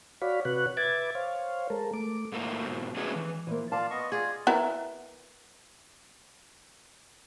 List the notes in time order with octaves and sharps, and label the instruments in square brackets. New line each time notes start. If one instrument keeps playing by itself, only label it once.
[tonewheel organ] F#4 C#5 D5 F5 B5
C3 F#4 B4 C#5 F#6
B4 E5 D6 G#6 A6
C5 C#5 F5
G#3 A4 A#4
A3 D6
[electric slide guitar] G#2 A3 A#3
G#2 B2
F#3 G#3 A3 B3 C#4 G#4
E3
[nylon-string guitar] E3 F3 A#3
[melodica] F4 D5 F5 [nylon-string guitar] A5
[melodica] B3 D#5 C#6
[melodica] F4 D5 [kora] G#4
[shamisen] B3 E4 A#4